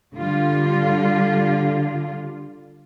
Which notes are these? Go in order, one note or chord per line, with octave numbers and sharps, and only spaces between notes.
D3 G3 F4